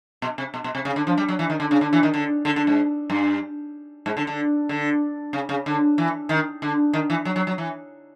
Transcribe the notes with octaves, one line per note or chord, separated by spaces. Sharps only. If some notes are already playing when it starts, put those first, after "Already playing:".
B2
C3
B2
B2
C3
C#3
D3
F3
G3
F#3
E3
D#3
D3
C#3
D3
E3
D#3
D3
D3
D3
G#2
G2
G#2
D3
D3
D3
C#3
C#3
D3
E3
D#3
D3
D#3
E3
F#3
F#3
F#3
E3